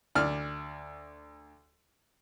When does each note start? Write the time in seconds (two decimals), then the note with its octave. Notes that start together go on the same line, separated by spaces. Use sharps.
0.15 D2 D5 F6